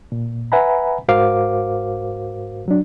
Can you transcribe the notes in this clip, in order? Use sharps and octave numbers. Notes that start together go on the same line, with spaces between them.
A#2
B4 E5 F#5 G#5 A#5 B5
G#2 F#4 A#4 C5 F5 D6
F#3 D4